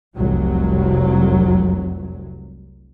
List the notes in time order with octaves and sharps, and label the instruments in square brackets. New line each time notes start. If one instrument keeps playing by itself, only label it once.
[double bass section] F1 C2 F#3